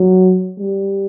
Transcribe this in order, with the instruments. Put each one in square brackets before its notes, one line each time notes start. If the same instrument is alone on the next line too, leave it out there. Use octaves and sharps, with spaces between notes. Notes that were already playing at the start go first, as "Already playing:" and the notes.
Already playing: [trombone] F#3
G3